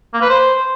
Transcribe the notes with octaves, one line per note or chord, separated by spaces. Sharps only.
A#3
B4
C5